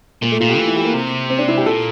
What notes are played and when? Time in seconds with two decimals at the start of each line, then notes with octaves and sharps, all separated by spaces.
0.22 A#2 A#3
0.32 A3
0.40 A#2 F4
0.49 G4
0.58 E3
0.68 E4
0.76 G4
0.85 A#3
0.94 C3
1.30 C4
1.39 D4
1.48 E4
1.58 G4
1.66 A#2 A4